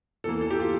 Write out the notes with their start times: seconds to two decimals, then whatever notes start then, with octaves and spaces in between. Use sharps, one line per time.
0.24 E2 E3 A#3 A4
0.41 A4
0.51 G4
0.59 F4